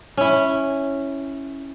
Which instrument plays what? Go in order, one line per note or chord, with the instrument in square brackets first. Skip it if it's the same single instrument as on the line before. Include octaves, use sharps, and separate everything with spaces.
[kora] C#4 E4